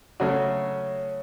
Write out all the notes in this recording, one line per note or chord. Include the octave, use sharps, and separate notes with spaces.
C#3 F#3 A3 C#4 F#4